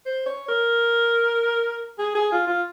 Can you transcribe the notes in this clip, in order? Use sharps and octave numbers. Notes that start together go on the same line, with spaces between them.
C5
C#5
A#4
G#4
G#4
F4
F4